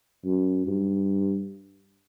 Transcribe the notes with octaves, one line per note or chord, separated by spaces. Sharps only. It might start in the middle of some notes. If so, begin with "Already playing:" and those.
F#2
G2